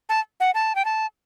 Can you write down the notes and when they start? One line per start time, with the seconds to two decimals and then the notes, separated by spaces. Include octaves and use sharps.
0.09 A5
0.40 F#5
0.54 A5
0.75 G5
0.85 A5